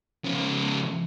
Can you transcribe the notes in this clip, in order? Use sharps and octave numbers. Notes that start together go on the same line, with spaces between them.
C#3 F3